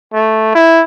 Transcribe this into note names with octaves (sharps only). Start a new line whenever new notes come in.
A3
E4